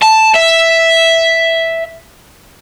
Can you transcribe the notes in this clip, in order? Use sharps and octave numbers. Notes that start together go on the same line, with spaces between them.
A5
E5